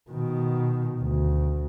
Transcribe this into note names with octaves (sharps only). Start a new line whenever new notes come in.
B2 D#3
D2